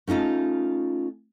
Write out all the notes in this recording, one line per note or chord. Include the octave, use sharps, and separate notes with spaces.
A3 C#4 D#4 F4 A5